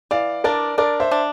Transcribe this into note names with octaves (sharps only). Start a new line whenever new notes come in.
E3 D5 F5
D4 A#4 D5
D4 A#4 D5
C5 E5
D4